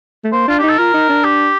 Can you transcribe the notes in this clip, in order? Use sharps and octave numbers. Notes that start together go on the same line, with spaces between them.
A3
A#3 C5
D4 F4
D#4 G4
A4
F4 A#4
D#4
D4
G4